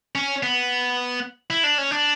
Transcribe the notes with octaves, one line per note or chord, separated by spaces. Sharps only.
C#4
B3
E4
D4
C#4
D4